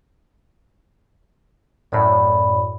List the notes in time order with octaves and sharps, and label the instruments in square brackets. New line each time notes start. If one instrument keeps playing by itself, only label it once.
[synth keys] F#2 A2 [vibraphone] D5 B5